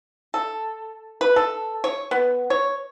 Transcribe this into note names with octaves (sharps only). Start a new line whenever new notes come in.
A4
B4
A4
C#5
B3
C#5